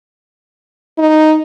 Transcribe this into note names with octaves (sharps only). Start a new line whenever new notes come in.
D#4